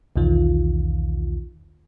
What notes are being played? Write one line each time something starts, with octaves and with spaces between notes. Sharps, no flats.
B1 E2 D#3 F4